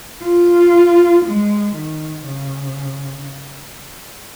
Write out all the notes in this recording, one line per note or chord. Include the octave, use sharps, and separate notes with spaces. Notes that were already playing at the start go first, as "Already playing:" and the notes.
F4
G#3
D#3
C#3